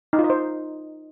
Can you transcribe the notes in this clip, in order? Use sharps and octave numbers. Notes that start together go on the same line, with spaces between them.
D#4
F4
D#5
C5